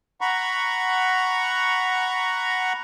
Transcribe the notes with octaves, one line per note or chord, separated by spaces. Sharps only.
F#5 A#5 B5 C#6